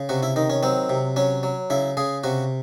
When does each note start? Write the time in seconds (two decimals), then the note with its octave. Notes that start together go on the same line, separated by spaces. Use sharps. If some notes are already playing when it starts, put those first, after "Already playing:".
Already playing: C#3
0.09 C3 F#4
0.23 E4
0.36 D#3 D#4
0.50 C#4
0.63 F#3 C4
0.90 C3
1.16 F#3 C#4
1.43 F#3
1.70 C#3 E4
1.97 C#3 G#4
2.24 C3 F#4